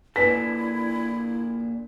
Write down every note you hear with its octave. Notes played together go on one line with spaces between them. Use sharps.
A#2 D4 E4 A4 B4 G#5 B6